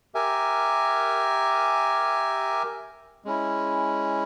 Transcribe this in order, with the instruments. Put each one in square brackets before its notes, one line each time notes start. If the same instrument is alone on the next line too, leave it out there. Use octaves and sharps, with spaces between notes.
[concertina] G4 A#4 E5 G#5
G#3 C#4 E4